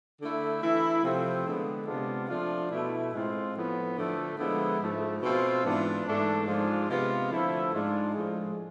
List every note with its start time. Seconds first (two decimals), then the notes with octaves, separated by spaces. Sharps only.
0.20 D3 A3 E4
0.61 E3 A3 E4
1.03 C3 F3 A3 C4
1.45 D3 G#3 B3
1.87 C3 G#3 B3 D4 F4
2.29 F3 A3 D4 F4
2.71 B2 A3 E4
3.13 A2 G#3 C4 F4
3.54 A2 F3 B3
3.96 D3 F3 A3
4.37 D3 F3 G#3 B3 E4
4.79 G#2 F3 A3
5.22 B2 A3 C4 F4
5.63 G#2 E3 B3 D4 F4
6.05 G#2 E3 A3 D4
6.46 G#2 F3 G#3 D4 F4
6.88 C3 G#3 B3 F4
7.31 D3 F3 A3 E4
7.72 G#2 G#3 D4 F4
8.13 A2 F3 G#3